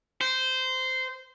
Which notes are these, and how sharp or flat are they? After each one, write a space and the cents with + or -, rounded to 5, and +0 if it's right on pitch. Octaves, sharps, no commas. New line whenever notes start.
C5 -15